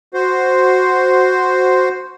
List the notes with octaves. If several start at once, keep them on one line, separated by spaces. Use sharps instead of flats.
F#4 C5